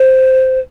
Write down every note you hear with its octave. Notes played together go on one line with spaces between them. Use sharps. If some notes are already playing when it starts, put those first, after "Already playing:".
Already playing: C5